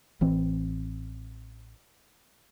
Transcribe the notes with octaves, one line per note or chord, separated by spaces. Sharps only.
A1 E3 C4